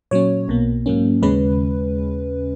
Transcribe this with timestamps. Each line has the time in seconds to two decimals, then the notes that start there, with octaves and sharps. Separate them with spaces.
0.11 A#2 F#3 C#4 C#5
0.48 B1 B2 A#3
0.86 G#2 F#3 A#3 C#4
1.22 D#2 C#3 G#3 C#4 B4